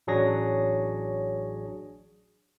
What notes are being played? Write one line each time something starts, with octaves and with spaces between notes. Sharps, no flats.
A1 F#3 D4 G#4 C#5 A#6